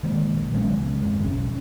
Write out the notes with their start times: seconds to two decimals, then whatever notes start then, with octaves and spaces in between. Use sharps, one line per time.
0.03 D#3 G#3 A#3
0.34 A#1
0.54 F#3 G#3 B3 C#4
0.78 C#2
1.03 G#1 F2 G#3
1.24 B1 C#4